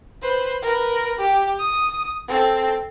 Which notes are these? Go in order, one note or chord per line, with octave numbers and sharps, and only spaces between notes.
B4 C5
A#4 B4
G4
D#6
C4 A4